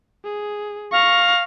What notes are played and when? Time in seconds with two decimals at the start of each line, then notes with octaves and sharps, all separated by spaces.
0.25 G#4
0.92 F5 C#6 A#6